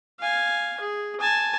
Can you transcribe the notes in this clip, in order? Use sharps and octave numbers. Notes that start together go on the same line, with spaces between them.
F5 G#5
G#4
G#5 A5